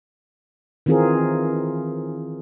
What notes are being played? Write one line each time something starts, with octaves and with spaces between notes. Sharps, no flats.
D#3 E3 C4 F4 G#4 A#4